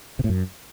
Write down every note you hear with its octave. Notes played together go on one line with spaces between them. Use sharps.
C3
A2
F#2